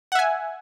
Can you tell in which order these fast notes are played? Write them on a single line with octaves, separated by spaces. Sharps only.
F#5 E5 G#5